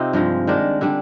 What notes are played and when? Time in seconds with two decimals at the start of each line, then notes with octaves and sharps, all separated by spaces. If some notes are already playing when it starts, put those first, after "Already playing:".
Already playing: C3 C4 D#4 F4
0.13 G2 F3 G#3
0.47 D#3 G#3 D4
0.81 D3 G3 D4